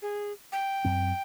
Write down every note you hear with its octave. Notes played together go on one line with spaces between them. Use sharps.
G#4
G5
F#2 C4